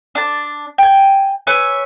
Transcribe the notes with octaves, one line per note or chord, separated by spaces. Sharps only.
D4 A5
G5 G#5
B4 C#5 E5 G#5